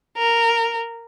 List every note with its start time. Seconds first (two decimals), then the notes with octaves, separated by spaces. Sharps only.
0.17 A#4